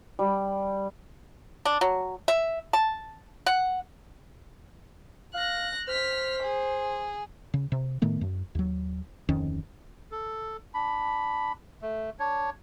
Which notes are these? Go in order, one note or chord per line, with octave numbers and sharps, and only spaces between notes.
G3
D4
F#3
E5
A5
F#5
F5 F#6 A#6
C5 F6 B6
G#4
C#3
C3
A2 D#3 A3 B3
F#2
D#2 F#3
D1 F2 D#3 C#4
A4
D4 B5
A3
D4 C#5